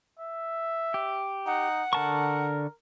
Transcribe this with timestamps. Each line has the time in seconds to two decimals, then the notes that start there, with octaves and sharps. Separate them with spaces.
0.19 E5
0.94 G4
1.46 D#4 F#5
1.93 D3 A#4 A5 C#6